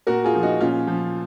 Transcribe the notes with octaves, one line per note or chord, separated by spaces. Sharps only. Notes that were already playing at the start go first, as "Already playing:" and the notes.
A#2 F#4 A#4
F4 G#4
F3
D#4 F#4
A#2 C#4 F4
F3